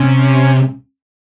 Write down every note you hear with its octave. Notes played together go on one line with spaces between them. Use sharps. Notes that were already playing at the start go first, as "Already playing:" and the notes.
Already playing: C3 C#4